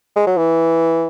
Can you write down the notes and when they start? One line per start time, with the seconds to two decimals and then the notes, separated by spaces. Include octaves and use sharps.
0.16 G#3
0.27 F#3
0.37 E3